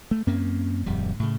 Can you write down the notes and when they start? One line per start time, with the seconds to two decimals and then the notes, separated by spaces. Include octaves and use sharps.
0.11 A3
0.27 F#2 A#3 C4 C#4
0.86 D1 F2 G3
1.20 A2 C#3